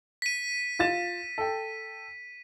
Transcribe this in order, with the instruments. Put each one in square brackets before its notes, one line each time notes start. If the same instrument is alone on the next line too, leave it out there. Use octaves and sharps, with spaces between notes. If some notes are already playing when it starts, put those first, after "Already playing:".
[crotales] B6 D#7
[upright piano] F4 A6 E7
A4 G5